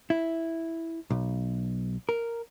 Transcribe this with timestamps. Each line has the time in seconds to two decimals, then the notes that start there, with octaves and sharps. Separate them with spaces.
0.10 E4
1.10 B1
2.09 A#4